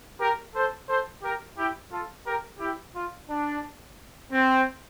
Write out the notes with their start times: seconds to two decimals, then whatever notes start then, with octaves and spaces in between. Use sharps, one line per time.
0.20 G4 A#4
0.55 A4 C5
0.88 A4 C5
1.23 G4 A#4
1.57 E4 G4
1.92 F4 A4
2.26 G4 A#4
2.60 E4 G4
2.95 F4
3.29 D4
4.31 C4